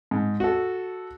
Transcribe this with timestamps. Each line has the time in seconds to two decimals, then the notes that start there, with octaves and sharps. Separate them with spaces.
0.11 G#2
0.40 F#4 A4